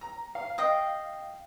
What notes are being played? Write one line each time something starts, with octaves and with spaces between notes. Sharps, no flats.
A#5
F5
D#5 G5